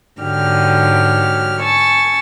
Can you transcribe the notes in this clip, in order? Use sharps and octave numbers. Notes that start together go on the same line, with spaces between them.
G#2 D3 F#3 G#3 G4 F6
G#5 A5 C#6 E6